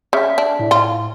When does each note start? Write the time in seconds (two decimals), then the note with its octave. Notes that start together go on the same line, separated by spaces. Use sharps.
0.13 C#3 E5
0.38 D4
0.59 A2
0.71 F4